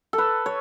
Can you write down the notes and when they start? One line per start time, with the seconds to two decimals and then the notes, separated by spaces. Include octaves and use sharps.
0.13 A4
0.18 B4
0.46 C#5